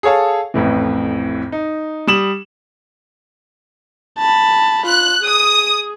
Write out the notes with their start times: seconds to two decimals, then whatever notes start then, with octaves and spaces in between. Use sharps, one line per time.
0.03 G#4 A4 C#5 F5 A5
0.54 A1 F2 A2 E3
1.52 D#4
2.07 G3 D#6 E7 F#7
4.19 A5 B5
4.86 F4 F#6
5.25 G#4 D#6